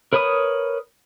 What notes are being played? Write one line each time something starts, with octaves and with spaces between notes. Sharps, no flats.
A#4 B4 C#5 B5 D#6